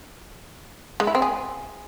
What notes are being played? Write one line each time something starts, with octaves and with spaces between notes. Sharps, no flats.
G#3
E4
C4
G#4